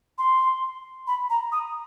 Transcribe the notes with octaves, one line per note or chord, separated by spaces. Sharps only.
C6
B5
A#5
D#6